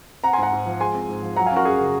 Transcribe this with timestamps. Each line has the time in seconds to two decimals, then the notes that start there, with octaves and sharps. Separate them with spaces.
0.24 C4 F#5 A#5
0.33 G#5 C6
0.38 G#2 F#5 A#5
0.53 G#2
0.66 F3
0.80 G#3 G#5 C6
0.95 C4
1.09 G#2
1.23 F3
1.36 F#3 F#5 A#5
1.46 F5 G#5
1.51 C#4 F#4 A#4
1.65 F#2 G#4
1.80 C#3